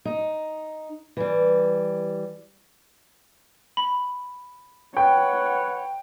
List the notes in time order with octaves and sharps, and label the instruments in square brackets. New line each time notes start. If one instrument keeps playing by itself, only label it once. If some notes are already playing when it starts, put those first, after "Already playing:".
[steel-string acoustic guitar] D#4
E3 G3
[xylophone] B5
[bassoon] B4 [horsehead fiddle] C#5 F#5 [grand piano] G5